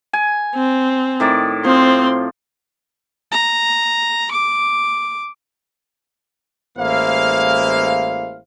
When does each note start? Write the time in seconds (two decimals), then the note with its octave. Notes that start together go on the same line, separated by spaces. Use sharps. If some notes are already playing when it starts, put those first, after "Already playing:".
0.13 G#5
0.55 C4
1.20 A2 D#3 D5
1.65 F3 C4 C6
3.31 A#5
4.31 D6
6.77 A1 G#3 A#3 E4 C5 F5